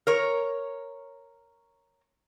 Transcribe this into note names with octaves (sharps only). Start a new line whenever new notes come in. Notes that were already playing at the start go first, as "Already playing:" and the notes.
A#4 C#5